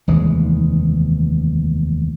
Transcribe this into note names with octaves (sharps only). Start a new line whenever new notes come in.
F1 D#2 E3 G#3